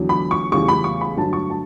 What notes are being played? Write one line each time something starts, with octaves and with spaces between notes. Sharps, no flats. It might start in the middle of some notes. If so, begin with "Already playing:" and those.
Already playing: E2 D3 F#3
B5
C#6
E2 C#3 G3 C#6
B5
C#6
B5
G2 D3 F#3 A5
C#6
A5